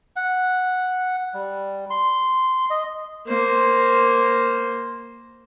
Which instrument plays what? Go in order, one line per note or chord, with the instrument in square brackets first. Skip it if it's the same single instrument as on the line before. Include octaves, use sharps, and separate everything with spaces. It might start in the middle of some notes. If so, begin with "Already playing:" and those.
[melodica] F#5
G3
C6
D#5
[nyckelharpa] A#3 C5